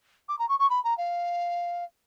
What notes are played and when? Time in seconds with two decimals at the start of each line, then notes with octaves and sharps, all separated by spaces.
0.29 D6
0.39 A#5
0.49 C#6
0.59 C#6
0.70 B5
0.84 A#5
0.98 F5